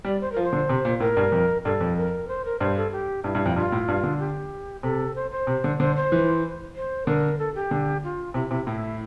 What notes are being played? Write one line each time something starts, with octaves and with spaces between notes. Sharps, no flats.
G3 D5
C5
F3 A#4
C5
D3
C3
A#2
A2 A#4
G2
F2
G2 A4
F2
A#4
C5
A#4
G2 C5
A4
G4
G2 E4
G2
F2
G2 F4
A2
G2
D3
G4
C3 A4
C5
C5
C3
D3
D3 C5
C5
E3
C5
D3 A#4
A4
G4
D3
F4
C3 E4
C3 E4
A2 E4